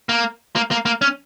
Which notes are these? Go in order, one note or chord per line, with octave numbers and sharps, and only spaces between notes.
A#3
A#3
A#3
A#3
C#4